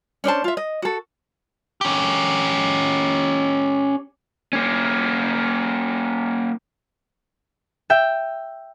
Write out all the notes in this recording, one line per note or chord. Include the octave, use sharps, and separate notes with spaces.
C#4 D4 C5 A5
F4 E5
D#5
F#4 A4
C#4 G4
A#3 C#4
E5 G5